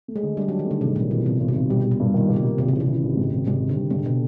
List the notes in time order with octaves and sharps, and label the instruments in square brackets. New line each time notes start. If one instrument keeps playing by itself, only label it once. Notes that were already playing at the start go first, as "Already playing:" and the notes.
[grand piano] A3
[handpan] G#3
[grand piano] D3
[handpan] G3 [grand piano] D4
[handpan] F#3
[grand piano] D4
[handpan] D#3
[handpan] D3 [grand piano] A3
[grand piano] G#1 [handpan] C3
[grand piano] G#1 [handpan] A#2
[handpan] B2 [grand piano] E3
[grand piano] G#1 [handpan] C3
[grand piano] G#1
[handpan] C3
[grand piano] G#1
[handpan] B2 [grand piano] G3
[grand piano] G3
[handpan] A#2
[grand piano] G2
D#3
A#3
[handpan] C3
[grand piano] G3
[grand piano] G#1 [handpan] C3
[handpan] C#3 [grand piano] E3
[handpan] C3
[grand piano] E3
G#1
G#2
G#1
[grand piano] G#2 [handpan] C3
[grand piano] D#3
[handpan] D3
[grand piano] G3
[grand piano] G#2 [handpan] D3
[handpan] B2